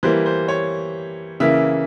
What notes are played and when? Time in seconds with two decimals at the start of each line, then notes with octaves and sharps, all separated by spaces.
0.03 E3 G3 A#3 C5
0.26 C5
0.48 C#5
1.40 C#3 E3 A#3 E5